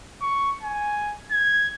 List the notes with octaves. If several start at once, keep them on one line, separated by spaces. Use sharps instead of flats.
C#6
G#5
G#6